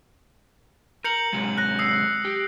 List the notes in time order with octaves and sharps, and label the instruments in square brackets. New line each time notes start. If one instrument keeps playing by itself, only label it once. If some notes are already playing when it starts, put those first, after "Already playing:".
[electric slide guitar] A#4 [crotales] G6 C#7 F#7
[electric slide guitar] C3 F#3 G#3
[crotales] F#6 A#6
D#6 E6 C7
[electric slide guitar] G4